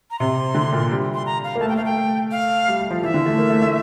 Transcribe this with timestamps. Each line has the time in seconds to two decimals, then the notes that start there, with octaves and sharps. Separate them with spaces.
0.11 A#5
0.19 C3 C6
0.55 D3
0.72 A#2
0.91 G3
1.14 C6
1.26 A#5
1.44 F5
1.55 A#3
1.61 A3 A5
1.69 G5
1.76 A3 F5
1.85 G5
2.31 F5
2.68 G3
2.79 G3
2.91 F3
3.03 E3 E5
3.14 D3
3.26 A3
3.38 A#3
3.50 A3
3.62 A3